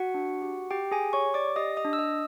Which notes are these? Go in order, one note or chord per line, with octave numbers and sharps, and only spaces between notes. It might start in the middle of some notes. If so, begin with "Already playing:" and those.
Already playing: F#4 F#5
D4
G4
G4 G5
G#4 G#5
G4
C#5 C#6
G4
D5 D6
G4 D#5 D#6
D#5 D#6
D4
E6
D#5 D#6